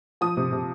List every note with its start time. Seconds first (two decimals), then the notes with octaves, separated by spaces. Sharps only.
0.21 F3 D#6
0.37 C3
0.52 C3